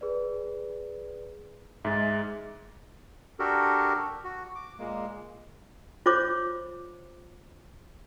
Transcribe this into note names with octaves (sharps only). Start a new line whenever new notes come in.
G#4 B4 D5
G#2 G#3 E5 A6
D4 F#4 G4 A4 A#4
F#4
D6
A#2 G#3 A#3
F4 C5 C#5 D6